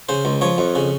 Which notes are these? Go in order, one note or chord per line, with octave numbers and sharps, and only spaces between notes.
C#3 C5
C#2
F3 C#5
F2
C#3